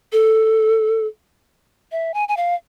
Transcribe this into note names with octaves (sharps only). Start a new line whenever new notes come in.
A4
E5
G#5
G#5
F5